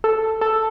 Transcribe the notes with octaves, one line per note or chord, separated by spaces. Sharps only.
A4
A4